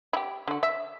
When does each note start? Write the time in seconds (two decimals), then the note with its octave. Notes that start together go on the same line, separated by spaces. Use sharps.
0.13 E4 G4
0.48 D3 F#4
0.63 E5